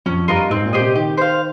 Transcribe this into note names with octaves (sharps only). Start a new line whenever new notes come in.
F2 C#4
G2 F4 A#4 D#5
G#2 C4
A#2
G4 C5 D#5
C3
D#3 G4
C5 F5